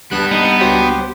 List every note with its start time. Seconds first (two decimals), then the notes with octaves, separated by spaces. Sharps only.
0.11 D2 G3 B3 D4 F#6
0.31 B3 D#4
0.60 C#2 F#4 G4 C5 C#5